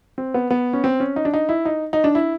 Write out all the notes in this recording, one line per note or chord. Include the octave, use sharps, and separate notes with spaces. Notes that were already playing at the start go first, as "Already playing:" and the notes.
C4
B3
B3
C#4
C4
C#4
D#4
D4
D#4
E4
D#4
D#4
D4
E4